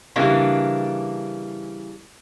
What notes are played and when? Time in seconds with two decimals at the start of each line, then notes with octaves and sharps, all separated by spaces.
0.16 C#3 E3 G3 A#3 D4